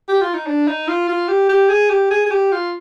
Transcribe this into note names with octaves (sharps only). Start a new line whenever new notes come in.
G4
F4
D#4
D4
D#4
F4
F4
G4
G4
G#4
G4
G#4
G#4
G4
F4